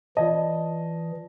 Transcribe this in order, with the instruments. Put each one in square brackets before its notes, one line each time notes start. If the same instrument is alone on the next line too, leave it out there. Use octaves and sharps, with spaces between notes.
[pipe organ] E3 [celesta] F4 D5 A5 [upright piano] D#5